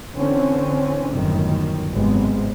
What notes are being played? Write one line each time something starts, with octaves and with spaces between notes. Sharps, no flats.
D3 E3 C4 C#4
G1 F#2 A2 D#3
G#1 F#2 C3 G#3 B3 C4